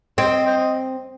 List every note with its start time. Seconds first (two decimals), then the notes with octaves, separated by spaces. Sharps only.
0.18 C4 C5 D#5
0.46 C5 D#5